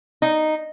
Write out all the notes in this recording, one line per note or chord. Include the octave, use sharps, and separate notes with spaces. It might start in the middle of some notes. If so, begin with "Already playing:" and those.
D#4